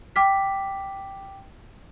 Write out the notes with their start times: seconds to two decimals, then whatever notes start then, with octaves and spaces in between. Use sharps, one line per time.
0.16 G5 D6 F6 B6